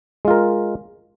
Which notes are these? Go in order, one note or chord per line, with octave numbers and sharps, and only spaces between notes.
G#3 F4 A#4